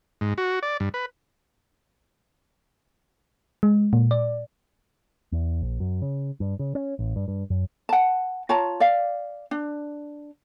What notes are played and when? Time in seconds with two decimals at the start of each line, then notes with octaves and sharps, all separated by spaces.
0.21 G#2
0.38 F#4
0.63 D5
0.80 G2
0.94 B4
3.63 G#3
3.93 A#2
4.11 D5
5.32 E2
5.62 A#1
5.80 F#2
6.02 C#3
6.40 G2
6.59 C#3
6.75 C#4
6.99 A1
7.16 G2
7.28 G2
7.50 F#2
7.89 F#5 A5
8.49 F4 C#5 A5 A#5
8.80 D5 F5
9.51 D4